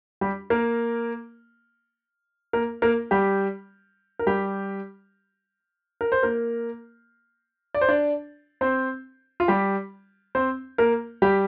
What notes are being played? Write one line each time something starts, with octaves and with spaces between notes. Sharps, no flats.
G3 G4
A#3 A#4
A#3 A#4
A#3 A#4
G3 G4
A#4
G3 G4
A#4
C5
A#3 A#4
D5
C5
D4 D5
C4 C5
F4
G3 G4
C4 C5
A#3 A#4
G3 G4